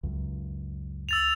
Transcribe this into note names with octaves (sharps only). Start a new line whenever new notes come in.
C#2 F#2
E6 A6 F7